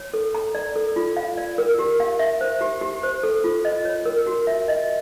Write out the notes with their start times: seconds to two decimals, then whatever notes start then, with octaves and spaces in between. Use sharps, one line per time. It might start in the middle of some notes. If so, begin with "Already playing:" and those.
Already playing: C#5
0.14 A4
0.35 A#5
0.55 D5
0.76 A4
0.96 F4
1.17 F5
1.37 D5
1.58 A#4
1.79 G4
2.00 F5
2.19 E5
2.41 C5
2.61 G4
2.81 G4
3.03 C5
3.23 A4
3.44 F4
3.65 D#5
3.85 C#5
4.06 A#4
4.27 F#4
4.47 E5
4.68 D#5